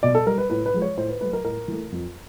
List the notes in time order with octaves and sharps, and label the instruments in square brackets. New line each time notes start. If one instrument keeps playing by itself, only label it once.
[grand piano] B2 D5
A4
G3 A#4
B4
A2 B4
B4
F3 G#3
C#5
A2 C5
B4
F#3 A3 B4
A#4
A2 A#4
E3 A3
F2